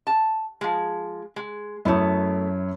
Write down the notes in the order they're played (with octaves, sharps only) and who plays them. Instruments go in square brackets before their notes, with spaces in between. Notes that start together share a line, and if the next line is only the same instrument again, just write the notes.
[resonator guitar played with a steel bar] A5
F3 G#3
G#3
[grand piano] F#2 E4 C#5 [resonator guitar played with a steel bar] A3 B3